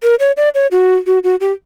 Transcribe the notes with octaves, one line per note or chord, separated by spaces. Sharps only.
A#4
C#5
D5
C#5
F#4
F#4
F#4
G4